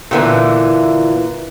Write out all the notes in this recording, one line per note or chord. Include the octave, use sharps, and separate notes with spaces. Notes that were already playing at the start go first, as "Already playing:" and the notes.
A#2 D3 E3